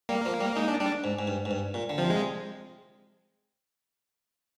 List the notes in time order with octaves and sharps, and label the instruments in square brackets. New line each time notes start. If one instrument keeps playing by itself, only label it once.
[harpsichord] G3 [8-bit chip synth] A#3
[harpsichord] F3
G3
[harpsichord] G#3 [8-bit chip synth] D#4
[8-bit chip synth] D4
[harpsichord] G3 [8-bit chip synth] D4
[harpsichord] G#2
G#2
G2
G#2
G2
A#2
D3
[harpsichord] C3 [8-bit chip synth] F3
[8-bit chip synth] G#3